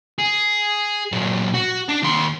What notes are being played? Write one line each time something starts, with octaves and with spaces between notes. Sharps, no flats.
G#4
A#2 F#3
F#4
D4
D#2 C6